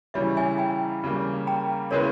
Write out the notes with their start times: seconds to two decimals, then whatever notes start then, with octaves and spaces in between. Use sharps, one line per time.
0.14 C#3 E3 G3 C#5 E5
0.37 E5 G#5
0.58 G5 A#5
1.04 C#3 G3 A#3
1.47 G5 A#5
1.91 C#3 G#3 B3 E4 A#4 C#5